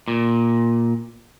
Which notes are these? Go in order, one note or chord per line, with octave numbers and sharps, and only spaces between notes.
A#2